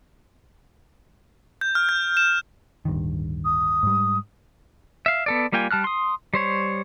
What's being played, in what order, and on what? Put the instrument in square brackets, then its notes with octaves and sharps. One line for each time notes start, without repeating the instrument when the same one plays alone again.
[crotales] G6
F6
G6
E7
[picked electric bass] D1 G2 D#3
[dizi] D#6
[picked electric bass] G#2 G3
[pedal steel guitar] E5 F5
B3 A4 D5
G3 A#3 F4 G5 G#5
G3 A5 F6 F#6
C6 D#6
G3 C5 C#5